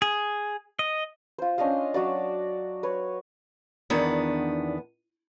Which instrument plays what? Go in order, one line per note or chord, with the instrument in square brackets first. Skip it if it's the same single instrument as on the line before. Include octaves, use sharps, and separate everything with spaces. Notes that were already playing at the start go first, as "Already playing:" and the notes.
[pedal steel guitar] G#4
D#5
[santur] F4 C5
C#4 D4 D#5 F5
F#3 F#4 D5
B4 C#5
[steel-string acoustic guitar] E2 D#3 B3 D4